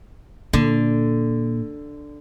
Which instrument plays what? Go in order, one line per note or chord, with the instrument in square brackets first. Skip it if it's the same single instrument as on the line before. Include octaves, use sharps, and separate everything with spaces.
[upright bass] A#2 [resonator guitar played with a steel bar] D3